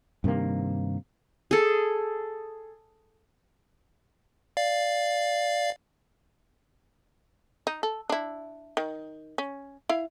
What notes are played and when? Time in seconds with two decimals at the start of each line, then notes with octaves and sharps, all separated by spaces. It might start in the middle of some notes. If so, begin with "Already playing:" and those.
0.24 G2 C3 D#3 A#3
1.51 G#4 A4
4.57 D5 F5
7.67 D#4
7.83 A4
8.10 D4 E4
8.77 D#3
9.38 C#4
9.89 E4 F5